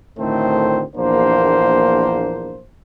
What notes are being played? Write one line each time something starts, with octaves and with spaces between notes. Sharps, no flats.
D2 A2 D#3 A3 C4 C5
A#1 E2 A#3 D4 C5